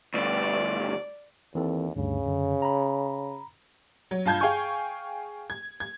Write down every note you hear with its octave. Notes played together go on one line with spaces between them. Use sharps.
D2 G2 D5
D#2 E3 C4 A4
D2 G2 C#3
F#2 D3
A#5 B5
F#3
G2 F4 A5 G6 G#6
G#4 F5 G5 G#5 C#6 G6
G#6
G#6